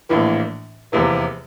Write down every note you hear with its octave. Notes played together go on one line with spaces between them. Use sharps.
A#1 A2 E3 A#3
F1 E2 C3 E3 A#3